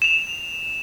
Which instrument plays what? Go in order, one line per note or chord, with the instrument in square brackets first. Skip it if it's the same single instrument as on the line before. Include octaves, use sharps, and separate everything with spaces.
[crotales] E7 F7